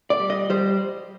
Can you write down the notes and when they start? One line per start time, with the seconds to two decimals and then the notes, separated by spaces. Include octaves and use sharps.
0.10 D5
0.19 G3
0.30 D#5
0.50 G3 C5